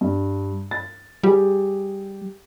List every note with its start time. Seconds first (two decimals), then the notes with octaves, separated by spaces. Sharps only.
0.01 G2
0.71 A6
1.23 G3 G4 G#4